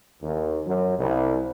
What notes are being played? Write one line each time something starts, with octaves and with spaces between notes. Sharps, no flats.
D#2
F#2
C2